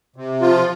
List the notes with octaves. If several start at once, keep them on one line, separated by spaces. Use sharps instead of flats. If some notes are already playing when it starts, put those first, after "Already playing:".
C3
F3 F4